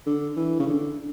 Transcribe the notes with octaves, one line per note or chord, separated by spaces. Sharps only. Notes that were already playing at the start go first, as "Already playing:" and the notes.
D3
E3
C#3
D3